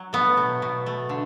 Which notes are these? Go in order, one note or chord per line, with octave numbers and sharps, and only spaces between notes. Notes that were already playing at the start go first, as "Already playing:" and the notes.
Already playing: F#3
A3 B3
B2
B2
A3
D3